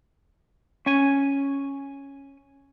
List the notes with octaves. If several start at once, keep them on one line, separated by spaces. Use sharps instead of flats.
C#4 G#5